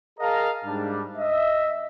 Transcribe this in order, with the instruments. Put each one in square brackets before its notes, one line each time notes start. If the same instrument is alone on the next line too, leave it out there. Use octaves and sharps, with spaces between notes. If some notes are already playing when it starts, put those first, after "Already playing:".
[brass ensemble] G#4 A#4 D#5 F5 A5 A#5
G#2 G3 D4
D#5 E5